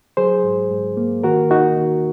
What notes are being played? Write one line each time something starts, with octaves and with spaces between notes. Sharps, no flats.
F#3 G#4 C5
G#2
G#2
A#3
D#3 F#4 A#4
D#2 D#4 F#4
D#2